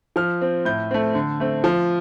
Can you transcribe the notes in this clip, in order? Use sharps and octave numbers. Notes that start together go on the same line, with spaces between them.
F3 F6
C4
A2 G6
A3 C4
D3
A3 C4
F3 F6